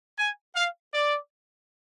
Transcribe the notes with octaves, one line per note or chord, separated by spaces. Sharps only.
G#5
F5
D5